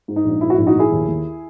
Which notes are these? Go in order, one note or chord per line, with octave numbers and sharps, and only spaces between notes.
G#2
D#4
A#1
G#2 E4
F#4
A#1 E4
D#4 F#4
A#1 E4 G#4
D#2
D#2